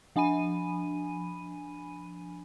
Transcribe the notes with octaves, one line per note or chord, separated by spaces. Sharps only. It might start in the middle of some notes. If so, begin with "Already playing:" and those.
F3 D4 G#5 B5 D#7